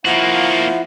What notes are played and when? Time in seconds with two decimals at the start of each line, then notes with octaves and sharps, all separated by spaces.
0.05 F3 A#3 E4 F#4 F#5